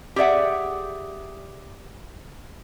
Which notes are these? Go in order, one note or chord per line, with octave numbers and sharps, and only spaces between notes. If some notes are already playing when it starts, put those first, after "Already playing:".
G4 G#4 D5 E5 F#5